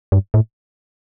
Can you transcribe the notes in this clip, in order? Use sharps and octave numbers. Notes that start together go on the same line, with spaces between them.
G2
A2